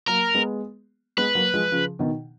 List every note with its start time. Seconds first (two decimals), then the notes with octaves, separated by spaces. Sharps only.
0.07 F#3 A#3 A#4
0.35 G#3 B3
1.17 G#3 B3 B4
1.35 F#3 A#3
1.54 F3 G#3
1.72 C#3 F3
1.99 B2 D#3